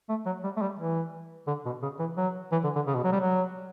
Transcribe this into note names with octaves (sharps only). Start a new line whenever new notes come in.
A3
F#3
G3
A3
G3
E3
D3
B2
C#3
E3
F#3
E3
D3
D3
C#3
B2
F#3
G3
F#3